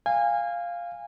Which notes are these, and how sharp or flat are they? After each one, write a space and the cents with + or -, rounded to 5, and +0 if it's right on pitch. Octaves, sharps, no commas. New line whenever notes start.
F5 +0 G#5 -25